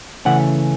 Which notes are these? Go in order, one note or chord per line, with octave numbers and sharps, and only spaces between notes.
C#3 E3 A3 C#4 F#5